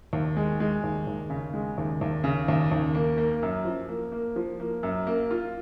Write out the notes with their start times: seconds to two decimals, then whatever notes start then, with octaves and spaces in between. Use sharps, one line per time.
0.13 D#2
0.37 G#3
0.60 G#3
0.84 D#2
1.07 D#2
1.30 C#3
1.54 G#3
1.78 D#2
2.01 D#2
2.24 C#3
2.48 D#2
2.71 D#2
2.95 A#3
3.18 A#3
3.43 F#2
3.65 F3
3.89 A#3
4.12 A#3
4.36 F3
4.60 A#3
4.83 F#2
5.07 A#3
5.31 F4